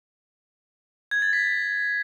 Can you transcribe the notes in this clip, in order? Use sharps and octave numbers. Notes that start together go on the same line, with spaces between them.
G#6
A6
B6